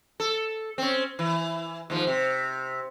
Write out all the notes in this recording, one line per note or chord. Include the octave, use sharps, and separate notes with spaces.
A4
C4 C#4
E3
D#2 G#2 F3
C3